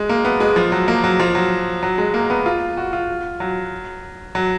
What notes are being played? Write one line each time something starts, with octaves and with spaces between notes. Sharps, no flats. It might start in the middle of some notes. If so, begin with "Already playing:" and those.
Already playing: G#3
A#3
B3
G#3
F3
F#3
A#3
F#3
F3
F#3
F#3
G#3
A#3
B3
F4
F#4
F4
F#3
F#3